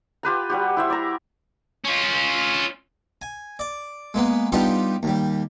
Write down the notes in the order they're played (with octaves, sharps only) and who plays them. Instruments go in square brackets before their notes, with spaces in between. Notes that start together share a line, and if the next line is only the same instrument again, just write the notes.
[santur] F4 G4 B4 A#5
G3 F#4 G4
E4 C5 E5
D5 A#5
[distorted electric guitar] C#4 F4
[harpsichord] G#5
D5
G#3 A#3 B3
G3 B3 D4 D#4 F4 G4
D#2 G3